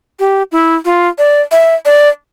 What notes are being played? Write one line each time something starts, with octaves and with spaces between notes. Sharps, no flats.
G4
E4
F4
D5
E5
D5